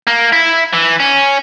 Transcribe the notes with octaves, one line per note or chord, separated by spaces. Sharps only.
A#3
E4
E3
C#4